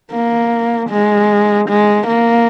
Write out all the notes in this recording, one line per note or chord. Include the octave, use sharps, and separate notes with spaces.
A#3
G#3
G#3
A#3